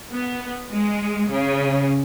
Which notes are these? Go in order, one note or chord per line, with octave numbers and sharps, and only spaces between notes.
B3
G#3
C#3